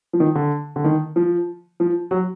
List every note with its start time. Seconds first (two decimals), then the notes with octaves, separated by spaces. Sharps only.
0.13 F3
0.20 D#3
0.35 D3
0.76 D3
0.84 D#3
1.16 F3
1.80 F3
2.11 F#3